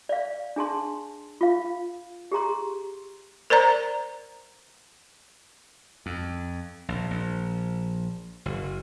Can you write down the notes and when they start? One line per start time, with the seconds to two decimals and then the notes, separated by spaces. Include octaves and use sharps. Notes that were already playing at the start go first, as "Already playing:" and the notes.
0.09 D5 F5
0.56 D4 G#4 A5 C6
1.41 F4 F5
2.32 G4 G#4 A#5 C6
3.50 A#4 C5 D5 A#5
6.06 F2
6.88 A#1
7.11 A#1
8.45 F#1